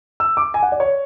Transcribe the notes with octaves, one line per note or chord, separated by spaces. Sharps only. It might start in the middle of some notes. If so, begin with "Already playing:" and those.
E6
D6
G#5
F#5
D5
C#5